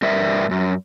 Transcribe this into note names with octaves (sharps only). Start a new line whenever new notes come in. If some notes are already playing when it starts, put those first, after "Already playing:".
G2 G3 A#4 D5 E5
F#2